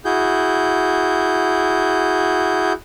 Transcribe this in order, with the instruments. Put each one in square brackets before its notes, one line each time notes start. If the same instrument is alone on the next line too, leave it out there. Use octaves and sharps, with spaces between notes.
[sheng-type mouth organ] E4 F#4 G#4 G6